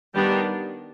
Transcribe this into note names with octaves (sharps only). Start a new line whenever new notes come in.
D#3 G3 B3 D4 G4